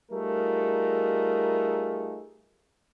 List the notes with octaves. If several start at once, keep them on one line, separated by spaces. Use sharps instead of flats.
G3 A3 D#4 F4 G#4 A#4